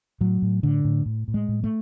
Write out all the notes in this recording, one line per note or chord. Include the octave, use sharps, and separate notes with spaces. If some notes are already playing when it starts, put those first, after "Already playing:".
A2 F#3
A2
A2 D3
A2
A2
A2
G#3
A2
A3